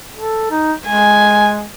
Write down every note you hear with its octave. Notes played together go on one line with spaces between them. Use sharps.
A4
D#4
G#3 G#5